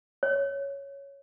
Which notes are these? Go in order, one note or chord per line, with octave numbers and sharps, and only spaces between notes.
C#5